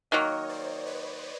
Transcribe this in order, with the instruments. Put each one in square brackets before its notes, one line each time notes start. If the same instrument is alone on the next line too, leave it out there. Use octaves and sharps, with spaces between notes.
[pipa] D#3 F#3 A#3 [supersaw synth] C#5 D#5
[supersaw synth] C5 D5
B4 C#5